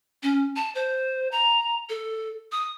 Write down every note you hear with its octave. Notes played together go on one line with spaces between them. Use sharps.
C#4
A5
C5
A#5
A4
D#6